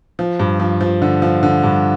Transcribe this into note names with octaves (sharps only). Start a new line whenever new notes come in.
F3
G2
F3
F3
D3
F3
D3
G2